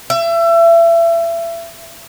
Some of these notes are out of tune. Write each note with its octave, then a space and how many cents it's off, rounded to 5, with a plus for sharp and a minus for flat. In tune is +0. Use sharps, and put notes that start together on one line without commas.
E5 +30